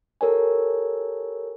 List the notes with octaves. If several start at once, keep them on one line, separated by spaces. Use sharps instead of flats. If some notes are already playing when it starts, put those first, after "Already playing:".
G4 A4 A#4 C#5 G#5